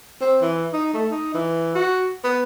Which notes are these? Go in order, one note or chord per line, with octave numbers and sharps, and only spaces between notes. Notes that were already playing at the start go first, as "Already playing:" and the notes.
C4
E3
D#4
A3
D#4
E3
F#4
B3